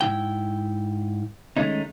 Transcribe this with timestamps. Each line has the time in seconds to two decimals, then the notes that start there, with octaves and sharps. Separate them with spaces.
0.01 G#2 F3 E4 G5
1.57 D#3 G#3 A3 C#4 D#4